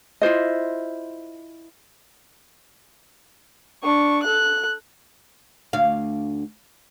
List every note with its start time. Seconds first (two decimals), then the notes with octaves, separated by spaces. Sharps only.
0.22 E4 F4 C5 D#5
3.83 D4 C#6
4.23 A4 F#6
5.73 D2 F5